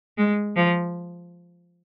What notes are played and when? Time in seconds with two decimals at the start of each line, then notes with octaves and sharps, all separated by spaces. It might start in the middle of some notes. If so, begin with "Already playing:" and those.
0.18 G#3
0.56 F3